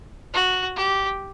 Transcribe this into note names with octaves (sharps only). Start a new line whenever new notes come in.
F#4
G4